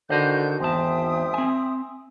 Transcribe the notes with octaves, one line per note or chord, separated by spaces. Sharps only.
D3 D#3 F#4 C5 D#5 G6
G#1 E2 C5 E5 G5 A5 D#6
C4 G#5